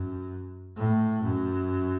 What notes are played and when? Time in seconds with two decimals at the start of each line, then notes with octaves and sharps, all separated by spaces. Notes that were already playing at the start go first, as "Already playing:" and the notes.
Already playing: F#2
0.77 A2
1.23 F#2